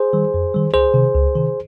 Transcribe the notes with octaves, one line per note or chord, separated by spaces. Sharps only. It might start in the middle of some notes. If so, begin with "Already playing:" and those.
Already playing: G#4 C5
D#3 G3
F2
D#3 G3
C#2 G#4 C5
C3 D#3
C#2
C3 D#3